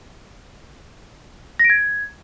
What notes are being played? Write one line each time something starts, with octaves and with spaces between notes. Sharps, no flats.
A#6
D7
G#6